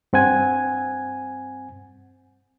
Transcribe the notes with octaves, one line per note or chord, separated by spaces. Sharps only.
G2 C4 F#5 G#5